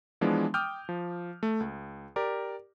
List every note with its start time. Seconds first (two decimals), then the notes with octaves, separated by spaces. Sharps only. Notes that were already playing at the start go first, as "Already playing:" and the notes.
0.21 E3 F3 G#3 B3 D4
0.54 G5 D6 D#6 F6 G6
0.89 F3
1.43 A3
1.60 C#2
2.16 G4 A#4 D5